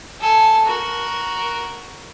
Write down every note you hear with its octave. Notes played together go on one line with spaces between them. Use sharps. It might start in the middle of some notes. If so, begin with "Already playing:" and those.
A4 G#5
F#4 A#4